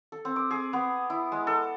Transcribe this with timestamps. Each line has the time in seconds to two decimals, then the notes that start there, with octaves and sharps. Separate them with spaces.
0.12 A4
0.25 C4
0.36 D6
0.51 G#4
0.73 B3
1.10 E4
1.32 G#3
1.47 A4